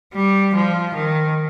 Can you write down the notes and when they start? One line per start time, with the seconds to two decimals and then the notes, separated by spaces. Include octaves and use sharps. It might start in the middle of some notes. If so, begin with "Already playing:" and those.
0.14 G3
0.55 F3
0.95 D#3